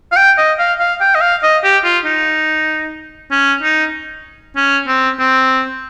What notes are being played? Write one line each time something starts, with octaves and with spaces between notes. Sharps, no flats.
F5
G5
D#5
F5
F5
G5
D#5
F5
D#5
G4
F4
D#4
C#4
D#4
C#4
C4
C4